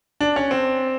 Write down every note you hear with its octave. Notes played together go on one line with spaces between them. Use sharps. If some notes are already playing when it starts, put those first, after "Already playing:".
D4
C#4
C4